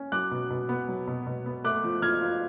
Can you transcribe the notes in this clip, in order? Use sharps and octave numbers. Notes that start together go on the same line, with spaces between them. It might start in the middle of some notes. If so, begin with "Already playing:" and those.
Already playing: C#4
F#3 D6 F#6
B2
B2
B3
F#3
B2
B2
B3
A3 D6 F#6
F3
F3 F6 G#6
F4